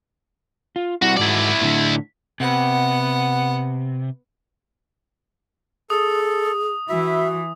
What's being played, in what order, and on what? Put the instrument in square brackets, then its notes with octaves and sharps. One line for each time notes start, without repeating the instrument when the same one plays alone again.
[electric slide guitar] F4
[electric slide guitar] G3 C4 E4 [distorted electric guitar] F#4
[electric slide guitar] G#2 F#4 [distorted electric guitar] E4 D5
[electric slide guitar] A2 D3
[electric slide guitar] C3 [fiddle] B3 F#5
[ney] G#4 [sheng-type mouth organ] A4 [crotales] D#6
[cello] E3 [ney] F#4 [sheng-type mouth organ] E5